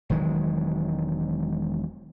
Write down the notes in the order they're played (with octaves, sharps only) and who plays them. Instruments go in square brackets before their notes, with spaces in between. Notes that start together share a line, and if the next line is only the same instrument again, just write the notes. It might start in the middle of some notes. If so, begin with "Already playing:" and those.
[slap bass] E1 D#3 F#3 G#3